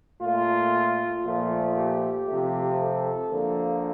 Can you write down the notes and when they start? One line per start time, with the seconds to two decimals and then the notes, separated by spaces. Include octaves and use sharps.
0.21 A#2 A3 F4
1.24 A#2 F3 A3 F4
1.76 G4
2.28 C3 F3 A3
2.80 A4
3.32 D3 F3 A#3